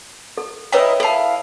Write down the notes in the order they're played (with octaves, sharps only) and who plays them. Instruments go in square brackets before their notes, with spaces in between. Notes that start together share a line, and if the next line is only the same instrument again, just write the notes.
[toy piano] A4
[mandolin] E4 A#4 D#5 [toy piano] B4 C#5 G5
[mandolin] E4 F5 [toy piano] A4 A5